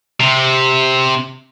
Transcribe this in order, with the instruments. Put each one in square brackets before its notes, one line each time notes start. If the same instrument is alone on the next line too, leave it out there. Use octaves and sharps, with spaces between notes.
[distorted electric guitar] C3